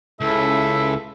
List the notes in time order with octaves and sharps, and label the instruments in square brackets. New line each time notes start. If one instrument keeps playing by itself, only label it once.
[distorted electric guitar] C#2 [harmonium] C#3 E4 A4 [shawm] E5